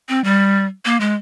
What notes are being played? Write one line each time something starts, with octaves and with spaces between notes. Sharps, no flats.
C4
G3
A#3
G#3